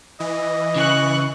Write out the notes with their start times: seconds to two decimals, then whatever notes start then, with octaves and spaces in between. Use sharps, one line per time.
0.20 E3 D#5
0.76 C#3 C#6 F#6